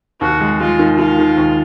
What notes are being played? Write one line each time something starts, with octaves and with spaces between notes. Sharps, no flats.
D#2 F#4
G#3
G#3 F4
D#3
D#3 F4
D#3
D#2